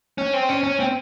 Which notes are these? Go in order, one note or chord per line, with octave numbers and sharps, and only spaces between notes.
C#4
C4
C#4
C#4
C4